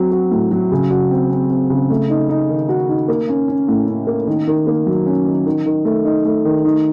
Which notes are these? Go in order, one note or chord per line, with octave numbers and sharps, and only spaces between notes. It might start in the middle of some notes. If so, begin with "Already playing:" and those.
Already playing: F#3 C4 F#4
F#4
A2
F#3
C#3
F#4
C4
C4
C4
C#3
A3
D#4
D#4
D#3
F#4
D#4
A#3
C#4
C#4
A2
C#4
A#3
D#3
D#3
A#3
F#3
C#4
D#3
D#3
D#3
A3
D#4
A3
D#3
D#4